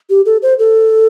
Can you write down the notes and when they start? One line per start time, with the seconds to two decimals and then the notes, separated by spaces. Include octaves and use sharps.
0.10 G4
0.26 A4
0.43 C5
0.59 A4